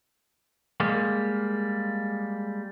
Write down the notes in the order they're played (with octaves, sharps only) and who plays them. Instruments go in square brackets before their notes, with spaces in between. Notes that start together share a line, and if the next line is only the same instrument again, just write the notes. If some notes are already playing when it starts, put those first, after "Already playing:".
[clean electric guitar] G3 G#3 A#3